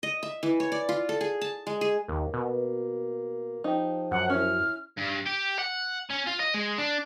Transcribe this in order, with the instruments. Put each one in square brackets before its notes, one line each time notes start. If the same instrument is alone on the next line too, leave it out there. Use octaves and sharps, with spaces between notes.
[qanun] D#5
E5
E3
C#5
D5
F4
A4
G#4
A5
G#3
G#4
[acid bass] D#2 [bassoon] A#3
[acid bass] B2
[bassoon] F3 [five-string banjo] D#4 G4
[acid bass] F#2 [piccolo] F#5
[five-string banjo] C#4 E4 [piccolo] F6
[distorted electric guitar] G2
G4
F#5
C#4
F4
D#5
G#3
D4